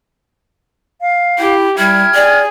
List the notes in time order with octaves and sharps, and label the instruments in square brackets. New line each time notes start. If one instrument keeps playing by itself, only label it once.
[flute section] F5
[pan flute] E4 [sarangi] G4
[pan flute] G3 [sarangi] E4 [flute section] G5 F6 G#6
[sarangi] G#4 [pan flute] D5